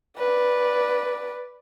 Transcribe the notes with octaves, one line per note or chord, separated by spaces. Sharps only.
B4 D5